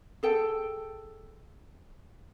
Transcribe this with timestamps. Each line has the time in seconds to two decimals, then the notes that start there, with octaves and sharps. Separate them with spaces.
0.23 G#4 A4 G5